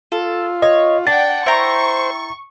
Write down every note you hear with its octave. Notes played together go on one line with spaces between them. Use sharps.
F4 A4
C#5 D#5
D4 D5 F#5 G5 A6
E4 C5 G5 A#5 C#6